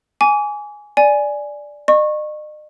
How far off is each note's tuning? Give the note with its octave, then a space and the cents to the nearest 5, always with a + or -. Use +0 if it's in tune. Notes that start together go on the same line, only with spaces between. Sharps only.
G#5 +0 D6 -40
D5 +0 G#5 +0
D#5 -45 C#6 -25